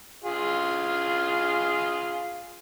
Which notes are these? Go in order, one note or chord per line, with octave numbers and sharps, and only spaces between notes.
F4 G#4